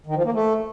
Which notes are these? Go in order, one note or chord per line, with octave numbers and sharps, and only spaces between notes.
D#3
F3
A#3
A3